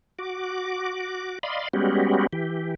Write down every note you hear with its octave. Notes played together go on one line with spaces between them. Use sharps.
F#4 D6
D5 D#5 F5 B5 C6
G3 G#3 B3 C#4 F#4 G4
E3 G4